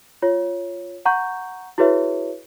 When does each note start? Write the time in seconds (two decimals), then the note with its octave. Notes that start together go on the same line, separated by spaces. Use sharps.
0.22 F4 C#5
1.05 F#5 A#5 C#6 G6
1.78 E4 F#4 G#4 B4 C#5 E5